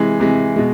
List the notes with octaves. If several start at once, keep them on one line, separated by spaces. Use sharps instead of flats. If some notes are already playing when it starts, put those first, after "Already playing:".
Already playing: C3 E3 G#3
C3 E3 G#3
B2 G#3